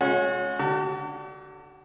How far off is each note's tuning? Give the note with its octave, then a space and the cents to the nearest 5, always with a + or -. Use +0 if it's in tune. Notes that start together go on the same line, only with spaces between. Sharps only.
G#3 +25 C#4 +0 F#4 -35
D3 +0 F#4 +45 A5 +35